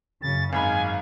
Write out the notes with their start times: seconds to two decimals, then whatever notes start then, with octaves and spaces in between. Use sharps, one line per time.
0.22 F#2 C#3 A6
0.53 G#1 G#2 F5 G#5 B5